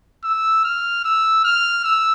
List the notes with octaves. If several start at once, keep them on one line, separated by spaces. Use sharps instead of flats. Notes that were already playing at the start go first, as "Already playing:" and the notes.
E6
F6
E6
F6
E6